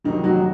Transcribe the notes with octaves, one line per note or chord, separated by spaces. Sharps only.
F2 C3 D#3 F#3 D#4
F#3 F#4